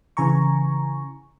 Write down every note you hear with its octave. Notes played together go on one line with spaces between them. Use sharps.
C#3 E3 G#5 A#5 C#6